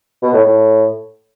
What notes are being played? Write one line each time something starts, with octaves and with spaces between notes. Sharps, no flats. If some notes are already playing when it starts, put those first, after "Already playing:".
B2
A2
A2